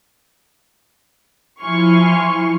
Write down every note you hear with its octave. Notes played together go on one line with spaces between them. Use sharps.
F3 E4 G#5 C6 C#6 F6